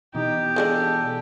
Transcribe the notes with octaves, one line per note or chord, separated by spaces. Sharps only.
B2 E3 D#4 G4
F3 G#3 D4 A4